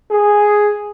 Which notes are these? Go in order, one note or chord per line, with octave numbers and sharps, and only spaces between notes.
G#4